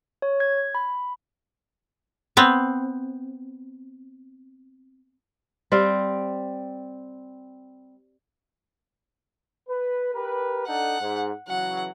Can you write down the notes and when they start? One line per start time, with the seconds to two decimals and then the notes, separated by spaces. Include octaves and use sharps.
0.22 C#5
0.40 G#6
0.75 B5
2.37 B3 C4
5.72 G3 C4 F5 G5
9.69 B4
10.13 G4 A#4 B4
10.68 D4 D#4 A4 F#5
11.00 G#2
11.48 C#3 E3 F#3 F#5